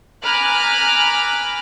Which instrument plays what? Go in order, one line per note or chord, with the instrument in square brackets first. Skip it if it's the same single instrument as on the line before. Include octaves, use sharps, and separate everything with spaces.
[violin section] G#5 A#5 B5 D6 F6 F#6